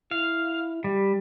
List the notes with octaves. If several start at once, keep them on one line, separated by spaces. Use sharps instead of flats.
E4 F5
G3 G4